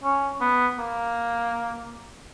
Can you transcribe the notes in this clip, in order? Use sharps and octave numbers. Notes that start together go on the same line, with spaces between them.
C#4
B3
A#3